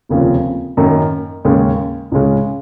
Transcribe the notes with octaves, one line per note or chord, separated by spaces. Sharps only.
F1 D#2 C#3 F3
F#2 D#3 A#3 C#4
D#2 C#3 G#3 C#4
C#2 C#3 G#3 C#4